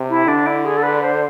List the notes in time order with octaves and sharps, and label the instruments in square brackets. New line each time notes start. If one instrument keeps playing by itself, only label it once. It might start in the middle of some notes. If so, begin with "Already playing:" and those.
Already playing: [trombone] C3
[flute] E4
[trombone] D3 [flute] D4
[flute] E4
G#4
A4
B4
C5